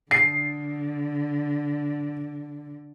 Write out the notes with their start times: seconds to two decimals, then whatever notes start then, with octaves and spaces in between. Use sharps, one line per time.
0.11 D3 C7